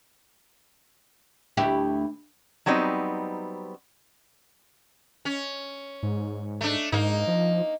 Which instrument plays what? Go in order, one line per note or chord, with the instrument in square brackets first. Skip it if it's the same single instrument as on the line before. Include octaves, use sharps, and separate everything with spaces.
[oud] D2 E4 G4
[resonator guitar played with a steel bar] F#3 G3 B3 C4 D#4
[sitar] C#4
[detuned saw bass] G#2
[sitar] A3 D4
[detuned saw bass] G#2 [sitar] A#3 D#4
[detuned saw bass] F3